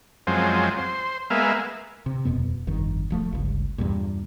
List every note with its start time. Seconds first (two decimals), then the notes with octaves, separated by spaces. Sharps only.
0.27 F#2 F3 G#3 C4
0.78 C5
1.30 G#3 A#3 B3 E5 F5
2.06 C3
2.25 D#1 F2 B2 B3
2.67 G1 F2 D#3
3.10 D1 F3 A3
3.32 G1 C#2
3.78 E2 G2 A#2